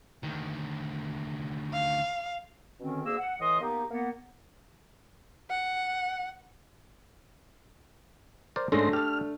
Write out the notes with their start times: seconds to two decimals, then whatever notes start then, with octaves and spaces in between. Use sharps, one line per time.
0.23 D2 D#3
1.73 F5
2.80 B2 D3 D#3 C4 C#4
3.05 D2 A#3 G#4 E6
3.18 F#5
3.39 A2 E3 D#5 C6 D#6
3.61 A#3 B3 D#4 G4
3.90 A#3 B3 F#5
5.50 F#5
8.56 A#4 C5 D5
8.72 G#2 G#3 A3 C#4 D4 C6 A#6
8.93 G4 A4 F6